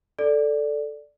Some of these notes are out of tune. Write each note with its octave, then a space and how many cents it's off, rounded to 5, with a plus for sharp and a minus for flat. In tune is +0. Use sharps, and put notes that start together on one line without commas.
A4 +0 D5 +0